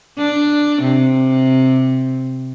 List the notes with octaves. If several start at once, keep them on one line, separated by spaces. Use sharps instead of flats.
D4
C3